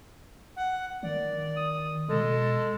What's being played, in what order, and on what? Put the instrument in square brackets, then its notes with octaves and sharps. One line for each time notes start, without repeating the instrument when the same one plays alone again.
[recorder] F#5
[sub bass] D#3 [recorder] D5
[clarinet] D#6
[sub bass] B2 [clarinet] G#3 [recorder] A4